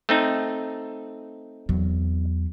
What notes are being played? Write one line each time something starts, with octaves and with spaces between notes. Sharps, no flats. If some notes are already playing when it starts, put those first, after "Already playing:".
A3 C4 D#4
E2 F#3